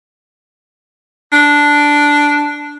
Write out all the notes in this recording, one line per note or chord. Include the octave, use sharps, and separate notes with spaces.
D4